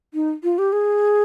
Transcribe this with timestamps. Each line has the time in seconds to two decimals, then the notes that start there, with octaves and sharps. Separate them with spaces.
0.14 D#4
0.44 F4
0.58 G4
0.72 G#4